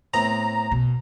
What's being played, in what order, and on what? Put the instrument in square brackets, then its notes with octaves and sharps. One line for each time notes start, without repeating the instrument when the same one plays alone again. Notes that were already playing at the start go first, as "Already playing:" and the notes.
[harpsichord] A2 B3 C4 [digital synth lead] A#5
[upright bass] B2